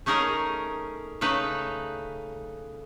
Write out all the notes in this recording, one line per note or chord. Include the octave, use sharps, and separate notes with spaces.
A3 C#4 D#4 G#4 A#4
C#3 A3 D#4 B4